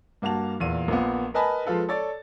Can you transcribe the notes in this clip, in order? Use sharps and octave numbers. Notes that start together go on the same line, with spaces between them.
G2 A#3 F#4 A5 F7
E2 A#2 D#7
A#1 F3 A#3 B3
A#4 B4 D#5 G#5 A5 B5
F3 G#3 F4 A4 B4
A4 C#5 D5 A6